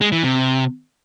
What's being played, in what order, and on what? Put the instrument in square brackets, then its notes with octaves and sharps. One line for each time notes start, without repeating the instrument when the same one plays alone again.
[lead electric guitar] G#3
E3
C3